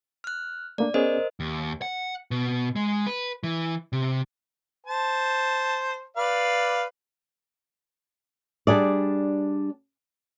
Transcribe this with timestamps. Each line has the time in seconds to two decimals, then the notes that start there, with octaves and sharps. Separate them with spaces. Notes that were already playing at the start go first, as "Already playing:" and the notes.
0.24 F6 F#6
0.78 A3 A#3 D4 D5
0.94 B3 C#4 G#4 A#4 C5 D#5
1.40 D#2
1.82 F#5
2.31 B2
2.76 G#3
3.06 B4
3.44 E3
3.93 C3
4.86 C5 A5
6.17 B4 D5 F5
8.67 G3 D4 G#4 D5